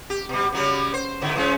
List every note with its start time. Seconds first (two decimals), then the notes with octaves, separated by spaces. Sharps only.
0.10 G4
0.29 B2 G3
0.53 C#3 F#3 G3
0.94 C5
1.21 G#2 D3 E4
1.36 E3 G#3 C#4